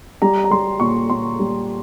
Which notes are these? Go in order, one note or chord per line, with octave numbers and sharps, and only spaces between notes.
G3 A#5
A#5
G3 C6
A#2 C#6
A#2 C6
G3